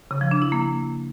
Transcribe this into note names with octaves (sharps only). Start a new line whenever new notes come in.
C#3
F3
D4
E4
A#3